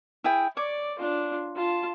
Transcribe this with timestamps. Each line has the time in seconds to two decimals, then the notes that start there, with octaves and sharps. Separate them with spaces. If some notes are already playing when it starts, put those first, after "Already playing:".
0.24 E4 G#4 G5
0.57 C#5 D5 D6
0.99 D4 F4
1.56 F4 A5